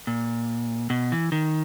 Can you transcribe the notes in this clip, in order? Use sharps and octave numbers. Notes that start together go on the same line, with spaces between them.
A#2
B2
E3
D#3